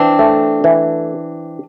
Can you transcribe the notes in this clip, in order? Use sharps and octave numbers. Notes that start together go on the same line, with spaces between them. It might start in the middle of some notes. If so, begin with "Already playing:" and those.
Already playing: E3 C4 D4
A3
E3